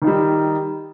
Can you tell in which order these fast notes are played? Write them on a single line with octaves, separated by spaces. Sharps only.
D#3 D#4 G3